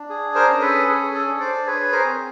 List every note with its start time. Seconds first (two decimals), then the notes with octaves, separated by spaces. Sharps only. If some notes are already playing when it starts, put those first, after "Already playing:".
Already playing: D4
0.10 G#4
0.35 A#4 C5
0.48 C#4
0.62 A4 B4
0.87 G#4 A4
1.15 A4
1.27 D4
1.40 C5 D5
1.66 G#4 B4 C#5
1.92 A#4 C5
2.05 C4